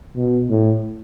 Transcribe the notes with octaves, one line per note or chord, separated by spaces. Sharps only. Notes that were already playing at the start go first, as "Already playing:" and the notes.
B2
A2